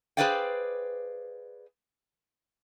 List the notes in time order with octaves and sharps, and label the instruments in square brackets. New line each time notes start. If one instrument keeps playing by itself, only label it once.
[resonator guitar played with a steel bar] G#4 B4 C5 D5 F5 G5